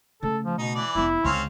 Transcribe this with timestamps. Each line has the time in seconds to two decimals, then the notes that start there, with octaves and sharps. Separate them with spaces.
0.23 C#3 A3 A4
0.45 F3
0.58 B2 D#4
0.75 E3 D5
0.95 F1 B3 E4
1.24 C#2 D3 C4 C#4 F5